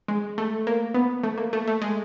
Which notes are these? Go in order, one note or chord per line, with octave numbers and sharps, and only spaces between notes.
G#3
A3
A#3
B3
A3
A#3
A3
A3
G#3